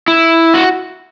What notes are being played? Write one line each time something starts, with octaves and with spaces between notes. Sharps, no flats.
E4
F#4